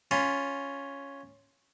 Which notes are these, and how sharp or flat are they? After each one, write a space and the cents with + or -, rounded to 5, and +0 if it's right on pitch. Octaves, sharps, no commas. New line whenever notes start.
C#4 +0 F4 +0 B5 +0